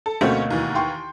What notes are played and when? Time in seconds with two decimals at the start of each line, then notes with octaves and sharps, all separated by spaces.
0.06 A4
0.21 D2 B2 A3 A#3 C4 C#4
0.51 D#2 E3
0.75 G5 C6 C#6